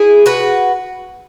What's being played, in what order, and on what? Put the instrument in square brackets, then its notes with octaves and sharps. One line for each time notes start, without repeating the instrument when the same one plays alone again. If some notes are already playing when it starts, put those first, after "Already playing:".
Already playing: [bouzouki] E4 G#4
F#4 B4